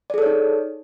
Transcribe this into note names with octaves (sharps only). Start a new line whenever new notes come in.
D#4 G#4 A4 C#5 D5